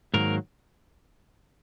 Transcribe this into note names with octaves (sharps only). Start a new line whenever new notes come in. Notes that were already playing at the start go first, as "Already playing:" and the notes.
G#2 D#3 F#3 A#3 A#4